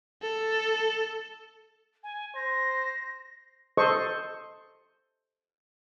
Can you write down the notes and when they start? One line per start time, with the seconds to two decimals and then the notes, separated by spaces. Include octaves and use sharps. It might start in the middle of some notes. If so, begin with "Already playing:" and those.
0.22 A4
2.03 G#5
2.36 C5 A#6
3.77 A4 C5 D#5 C#6